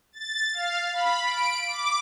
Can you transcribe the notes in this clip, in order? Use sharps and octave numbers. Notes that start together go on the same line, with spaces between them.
A6
F5
B5
D7
D6